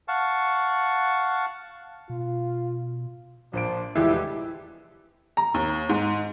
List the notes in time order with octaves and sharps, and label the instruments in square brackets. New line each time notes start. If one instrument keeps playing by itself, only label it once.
[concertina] F5 F#5 A5 C#6
[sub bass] B2 [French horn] F4
[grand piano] A#1 C5 D7 [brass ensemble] F3 D4
[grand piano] F1 E2 [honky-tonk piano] E3 F3 G#3 [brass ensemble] G3 G4 [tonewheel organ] E4
[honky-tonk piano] A#5
D#2
G#2